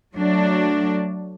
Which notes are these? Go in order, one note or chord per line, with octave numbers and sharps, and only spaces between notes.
F#3 A3 D4